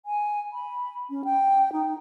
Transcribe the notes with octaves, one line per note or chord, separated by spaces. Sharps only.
G#5
B5
C#4
G5
D#4